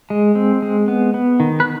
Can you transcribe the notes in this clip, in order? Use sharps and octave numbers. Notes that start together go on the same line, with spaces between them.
G#3
C4
G#3
B3
B3
D#3
B4